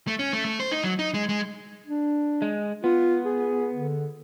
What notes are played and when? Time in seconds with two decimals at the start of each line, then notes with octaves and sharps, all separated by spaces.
0.08 A3
0.19 C#4
0.33 A3
0.45 A3
0.60 C5
0.72 D#4
0.84 F#3
0.99 D#4
1.14 G#3
1.29 G#3
1.87 D4
2.42 G#3
2.84 B3 F4
3.25 G#4
3.74 D3